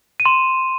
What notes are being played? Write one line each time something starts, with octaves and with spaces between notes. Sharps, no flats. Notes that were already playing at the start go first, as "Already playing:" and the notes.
D#7
C6 E7